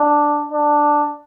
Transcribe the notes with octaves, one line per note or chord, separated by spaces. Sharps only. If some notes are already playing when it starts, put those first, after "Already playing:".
Already playing: D4
D4